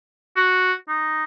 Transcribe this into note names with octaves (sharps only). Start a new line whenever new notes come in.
F#4
D#4